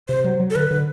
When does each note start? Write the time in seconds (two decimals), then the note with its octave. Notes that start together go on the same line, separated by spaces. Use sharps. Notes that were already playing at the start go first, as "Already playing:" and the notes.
0.08 C3 C5
0.24 F#3
0.40 F#3
0.50 A4
0.55 D3 B4
0.71 D3